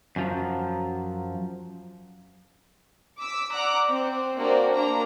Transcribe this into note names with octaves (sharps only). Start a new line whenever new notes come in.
F#2 F3 F#3
D6 E6 B6
D5 F#5 A#5 D6 F#6
C4
A#3 D4 F#4 G4 C5 D5
A#3 D4 A#5